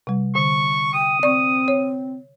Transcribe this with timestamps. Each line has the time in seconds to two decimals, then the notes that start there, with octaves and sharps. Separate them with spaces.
0.07 C3 G3
0.35 D3 C#6
0.94 G5 D#6
1.23 C4 D5 C#6
1.68 C#5